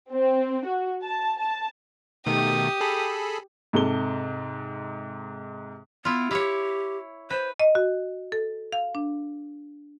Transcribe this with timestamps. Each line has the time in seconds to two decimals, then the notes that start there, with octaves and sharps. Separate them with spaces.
0.11 C4
0.65 F#4
1.02 A5
1.38 A5
2.26 B2 D#3 A3 G4 D#6
2.81 G#4 A4 B5
3.73 G#2 C3 A4 G7
6.05 B3 E4 F4
6.31 E4 G4 C#5
7.30 B4 C5
7.60 D#5
7.75 F#4
8.32 A4
8.73 F5
8.95 D4